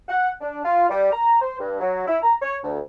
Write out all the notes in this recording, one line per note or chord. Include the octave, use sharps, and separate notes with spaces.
F#5
D4
F4
G3
A#5
C5
G2
F#3
E4
A#5
C#5
D2